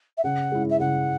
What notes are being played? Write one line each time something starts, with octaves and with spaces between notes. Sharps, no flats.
E5
C#3 F#5
G#3 C#4 E4
E5
C#3 F#5